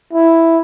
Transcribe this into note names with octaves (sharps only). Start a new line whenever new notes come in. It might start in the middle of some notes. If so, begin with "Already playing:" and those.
E4